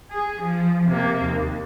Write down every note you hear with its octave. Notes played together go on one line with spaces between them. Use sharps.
G#4
F3
C3 A#3
D#2